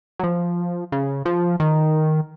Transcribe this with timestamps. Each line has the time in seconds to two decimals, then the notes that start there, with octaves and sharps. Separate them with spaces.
0.19 F#3
0.23 F3
0.92 C#3
1.25 F3
1.60 D#3